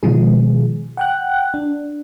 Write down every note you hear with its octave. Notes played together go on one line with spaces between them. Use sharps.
B2 D#3 F3 G#3 G#4
F#5 G5 F#6
D4